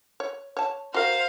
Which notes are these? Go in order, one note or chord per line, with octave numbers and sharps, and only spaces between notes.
C#5
C#5 A5
F#4 A#4 C5 F5